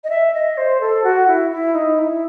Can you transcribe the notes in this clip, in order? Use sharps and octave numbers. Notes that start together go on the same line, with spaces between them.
D#5
E5
D#5
C5
A4
F#4
E4
E4
D#4
E4